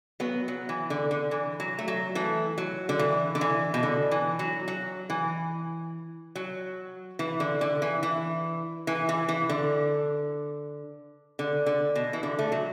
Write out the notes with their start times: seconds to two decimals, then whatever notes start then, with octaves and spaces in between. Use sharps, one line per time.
0.20 F#3 B3
0.48 F#3
0.69 E3
0.90 D3
1.11 D3
1.31 E3
1.60 F#3
1.79 A3
1.88 F#3
2.15 E3 A3
2.58 F#3
2.89 D3
2.99 E3
3.35 D3
3.41 E3
3.74 B2
3.83 D3
4.11 E3
4.39 F#3
4.68 F#3
5.10 E3
6.36 F#3
7.19 E3
7.40 D3
7.61 D3
7.82 E3
8.03 E3
8.87 E3
9.09 E3
9.29 E3
9.49 D3
11.39 D3
11.66 D3
11.96 B2
12.13 E3
12.23 D3
12.39 A3
12.52 F#3